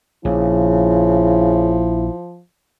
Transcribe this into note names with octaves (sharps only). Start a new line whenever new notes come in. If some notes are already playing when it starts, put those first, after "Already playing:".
A#1 C#3 F3 E4